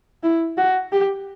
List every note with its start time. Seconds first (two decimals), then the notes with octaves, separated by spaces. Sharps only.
0.23 E4
0.57 F#4
0.92 G4